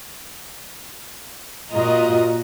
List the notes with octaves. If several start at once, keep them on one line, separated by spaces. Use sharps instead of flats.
A#2 F4 F#4 D#5 A#5